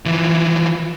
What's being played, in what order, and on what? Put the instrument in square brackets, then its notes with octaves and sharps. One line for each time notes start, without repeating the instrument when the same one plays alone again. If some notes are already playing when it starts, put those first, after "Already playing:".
[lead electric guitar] E3 F3